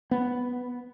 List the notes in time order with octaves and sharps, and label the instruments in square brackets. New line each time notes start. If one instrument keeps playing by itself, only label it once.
[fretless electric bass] B3